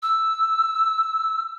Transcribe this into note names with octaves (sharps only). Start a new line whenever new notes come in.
E6